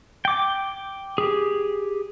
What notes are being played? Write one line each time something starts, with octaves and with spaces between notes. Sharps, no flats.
G5 D6
G4 G#4